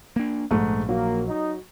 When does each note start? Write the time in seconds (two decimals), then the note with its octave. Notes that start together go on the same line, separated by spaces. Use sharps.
0.16 A#3 D4
0.51 A#1 G#2 A3
0.89 F#3 A#3
1.27 D#4